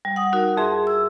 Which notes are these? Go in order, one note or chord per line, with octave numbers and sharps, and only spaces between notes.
G3
F#5 D#6
D#4 F#4 A#4
F2 G#4 E5 C6
E6